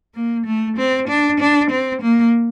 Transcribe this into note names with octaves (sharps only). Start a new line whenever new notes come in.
A#3
A3
C4
D4
D4
C4
A#3